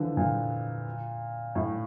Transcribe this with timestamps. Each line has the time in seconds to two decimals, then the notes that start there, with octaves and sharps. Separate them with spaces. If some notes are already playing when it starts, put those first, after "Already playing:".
Already playing: D3 E3 F3
0.17 A#2
1.55 A2